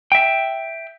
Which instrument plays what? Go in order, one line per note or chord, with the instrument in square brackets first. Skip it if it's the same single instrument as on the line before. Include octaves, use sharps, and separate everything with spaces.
[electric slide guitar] E5 G5